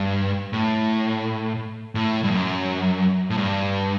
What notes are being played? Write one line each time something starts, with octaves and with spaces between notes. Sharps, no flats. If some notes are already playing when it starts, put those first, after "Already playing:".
Already playing: G2
A2
A2
G2
F#2
A2
G2